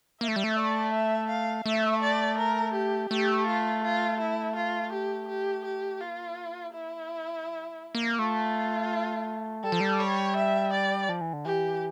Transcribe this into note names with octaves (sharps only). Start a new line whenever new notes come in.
A#3 E5
A3
G3
A3
D5
E5
F5
A3 E5
D5
A#4
G4
A3 G4
F4
F4
E4
F4
G4
G4
G4
A#3 F4
E4
G3
A3
A#3
A3 F4
G3 A4
F3
G3
C#5
E5
D5
F3
E3
D3
E3 G4